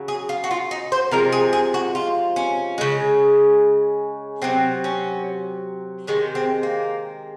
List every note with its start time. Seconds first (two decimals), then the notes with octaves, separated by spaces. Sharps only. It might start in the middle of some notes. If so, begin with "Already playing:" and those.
Already playing: C#3 F#3
0.08 G#4
0.29 F4
0.44 F#4
0.51 F4
0.71 D#4
0.92 C5
1.11 C3 F3 G#3 A#4
1.32 G#4
1.53 G#4
1.74 F#4
1.95 F4
2.36 C#4
2.78 C#3 G#3
4.42 C3 F#3 C4
4.84 C#4
6.07 C3 D#3 G#3 C#4
6.35 C4
6.63 A#3